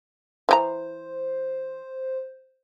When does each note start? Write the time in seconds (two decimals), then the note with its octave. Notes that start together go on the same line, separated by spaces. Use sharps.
0.49 E3 G4 C5 A#5